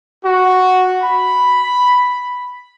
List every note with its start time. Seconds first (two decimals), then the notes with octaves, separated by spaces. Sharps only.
0.25 F#4
1.02 B5